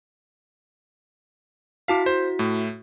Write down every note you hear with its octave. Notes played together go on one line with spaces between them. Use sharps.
E4 F#4 F5 A5 D6 B6
C5
A2 A3